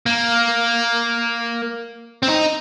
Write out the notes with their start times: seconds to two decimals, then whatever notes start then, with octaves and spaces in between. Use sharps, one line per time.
0.06 A#3
2.23 C4
2.28 D#4